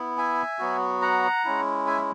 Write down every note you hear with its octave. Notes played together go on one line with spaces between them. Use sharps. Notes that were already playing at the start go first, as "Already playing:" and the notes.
Already playing: B3 E4
E5 G#5
F#3 B3 F#4
F#5 A#5
G#3 C#4 E4
E5 G#5